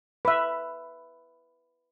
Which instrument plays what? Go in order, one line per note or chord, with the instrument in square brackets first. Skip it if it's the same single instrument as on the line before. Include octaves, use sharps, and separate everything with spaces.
[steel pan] B4 E5